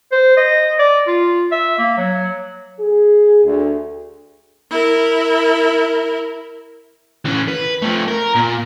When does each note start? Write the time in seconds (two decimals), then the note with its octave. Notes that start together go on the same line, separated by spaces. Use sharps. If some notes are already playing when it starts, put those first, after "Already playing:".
0.12 C5
0.37 D#5
0.79 D5
1.07 F4
1.52 E5
1.78 A#3
1.98 F#3
2.79 G#4
3.45 D2
4.71 E4 A#4
7.25 E3 C#4
7.48 B4
7.82 F3 A3
8.08 A#4
8.35 A#2